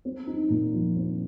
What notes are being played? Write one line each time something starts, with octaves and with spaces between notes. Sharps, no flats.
C4
D#4
A#2
F3
C4